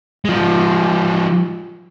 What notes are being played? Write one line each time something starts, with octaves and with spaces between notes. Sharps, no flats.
F3 G#3